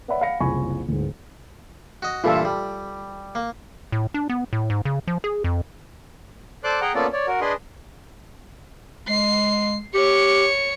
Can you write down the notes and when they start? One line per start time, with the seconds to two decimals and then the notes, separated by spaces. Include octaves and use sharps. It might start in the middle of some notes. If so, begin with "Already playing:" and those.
0.08 B4 C#5 D5 E5 F#5 B5
0.21 F5 F#5 B5 A#6 C#7
0.40 F#1 C2 F3 G#5 B5 C#6
0.89 D1 G#2
2.02 F#4 D#5
2.24 G2 A#2 E3 F4 A4
2.45 G3
3.35 A#3
3.92 A2
4.14 D4
4.30 B3
4.53 A2
4.70 G#2
4.85 C#3
5.08 F3
5.24 G#4
5.44 F2
6.64 A4 C5 D5 C6 D6 F#6
6.81 G#4 F#5 G5 A#5
6.95 A#3 B3 C#4 F4 A4 D5
7.13 C#5 D5
7.27 F#4 A#4
7.41 D4 G#4 B4 D#5 C6
9.08 G#3 C7
9.95 G4 C#5 C#7